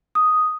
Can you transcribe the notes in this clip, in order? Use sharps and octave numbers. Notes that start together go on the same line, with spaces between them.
D#6